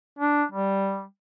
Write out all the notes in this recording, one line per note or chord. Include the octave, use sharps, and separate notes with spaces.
D4
G3